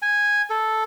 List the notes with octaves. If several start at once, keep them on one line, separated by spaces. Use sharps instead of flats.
G#5
A4